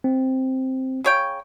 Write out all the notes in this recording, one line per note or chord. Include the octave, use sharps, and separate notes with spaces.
C4
C#3 C#5 G5